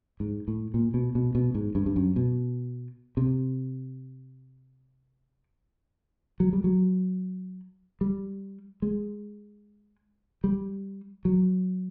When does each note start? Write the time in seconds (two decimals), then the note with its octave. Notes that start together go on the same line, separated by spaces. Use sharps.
0.20 G#2
0.48 A2
0.74 A#2
0.94 B2
1.15 B2
1.35 B2
1.55 G#2
1.75 G2
1.86 G2
1.96 F#2
2.16 B2
3.17 C3
6.40 F#3
6.53 G3
6.64 F#3
8.01 G3
8.82 G#3
10.44 G3
11.25 F#3